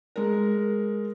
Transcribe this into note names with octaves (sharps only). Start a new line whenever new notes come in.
G#3 A#4